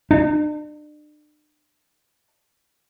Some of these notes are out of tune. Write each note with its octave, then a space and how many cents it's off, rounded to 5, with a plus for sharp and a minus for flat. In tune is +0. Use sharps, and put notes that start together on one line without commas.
D4 +40